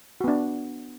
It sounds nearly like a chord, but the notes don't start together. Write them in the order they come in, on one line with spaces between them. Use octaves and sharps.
F#4 B3 D4